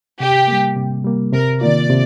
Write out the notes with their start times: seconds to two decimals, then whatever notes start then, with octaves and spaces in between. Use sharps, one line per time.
0.20 C3 G4
0.48 G3 A#3
0.76 C3
1.05 G3 A#3
1.32 C3 A#4
1.61 D#3 A#3 F4 D5
1.90 C3